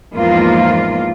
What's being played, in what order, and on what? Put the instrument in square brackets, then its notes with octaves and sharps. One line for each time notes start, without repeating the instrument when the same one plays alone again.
[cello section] E2 G#2 F3 A#3 F4